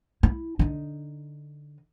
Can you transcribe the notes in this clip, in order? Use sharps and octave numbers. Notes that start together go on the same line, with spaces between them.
E4
D3 D#4